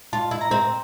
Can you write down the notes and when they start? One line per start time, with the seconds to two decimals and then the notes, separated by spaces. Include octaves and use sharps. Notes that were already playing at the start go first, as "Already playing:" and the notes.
0.13 F4 A5
0.31 E4
0.41 A#5
0.51 C4